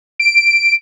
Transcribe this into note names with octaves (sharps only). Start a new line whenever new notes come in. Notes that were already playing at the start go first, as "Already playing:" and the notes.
D7